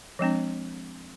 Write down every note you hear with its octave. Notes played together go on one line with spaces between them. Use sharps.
F3 G#3 C4 D4